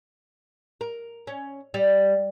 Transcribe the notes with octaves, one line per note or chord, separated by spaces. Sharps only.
A#4
C#4
G3